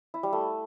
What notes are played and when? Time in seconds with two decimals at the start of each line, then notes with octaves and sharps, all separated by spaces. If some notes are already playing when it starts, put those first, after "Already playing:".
0.14 E4
0.23 G3
0.33 A3